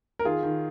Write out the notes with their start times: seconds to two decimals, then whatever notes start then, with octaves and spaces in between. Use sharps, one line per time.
0.19 A#4
0.24 D#3 F4 G#4
0.43 D#3